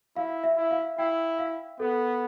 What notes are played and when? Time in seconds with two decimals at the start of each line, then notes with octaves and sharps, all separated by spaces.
0.16 E4 F5
0.44 E5
0.57 E4
0.71 F5
0.98 E4 G5
1.39 F5
1.80 B3 A4